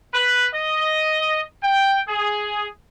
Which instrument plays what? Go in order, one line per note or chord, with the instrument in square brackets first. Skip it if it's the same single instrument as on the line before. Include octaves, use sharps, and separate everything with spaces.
[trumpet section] B4
D#5
G5
G#4